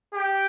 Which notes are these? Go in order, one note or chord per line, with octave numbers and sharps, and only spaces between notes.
G4